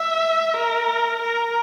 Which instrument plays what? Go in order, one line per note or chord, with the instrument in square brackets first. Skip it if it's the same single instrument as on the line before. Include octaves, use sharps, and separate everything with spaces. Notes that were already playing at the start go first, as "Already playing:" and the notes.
Already playing: [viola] E5
A#4
A#4